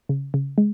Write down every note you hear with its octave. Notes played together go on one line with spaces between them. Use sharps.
C#3
C#3
G#3